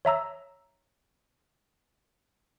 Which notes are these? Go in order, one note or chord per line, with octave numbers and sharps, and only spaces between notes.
C#5 E5 A#5 E6